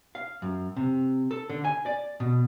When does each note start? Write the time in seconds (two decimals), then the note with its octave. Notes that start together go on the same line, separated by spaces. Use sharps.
0.15 F5
0.42 F#2
0.76 C3
1.31 A4
1.50 D3
1.65 G#5
1.86 D5
2.20 B2